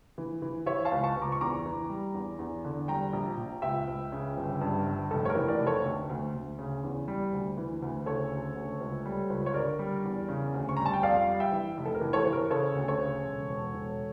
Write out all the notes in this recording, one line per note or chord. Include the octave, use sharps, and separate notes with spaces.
E3
E3
E3 C#5 E5
F5 A5
C#2
A5 C#6
C#2
A#5 D6
C#6
E2 A#5 D6
E3
G3
E2
E2
D3
G3 G5 A#5
A#1
A#1
C#2 E5 G5
C#2
C#3
G1
G2
G1
F1 A4
C#5
A#4
E3
A#4 D5
F1
A4 C#5
D2
D2
D2
C#3
E2
G3
D2
E3
D2
C#3 A4 C#5
D2
D2
C#2
G3
C#2
C#5
D3 A#4 D5
G3
E2
C#3
D2
C#6
G3 A#5
A5
G5
F2 D5 F5
G3
E5 G5
E3
F1
A4
A#4
E3
A4 C#5
E3 C#5
A#4
C#3 A4 C#5
D2
A4 C#5
C#3
E1
E1
E1